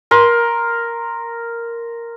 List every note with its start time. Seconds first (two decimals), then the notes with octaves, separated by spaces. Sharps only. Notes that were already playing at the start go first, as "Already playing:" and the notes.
0.11 A#4 C6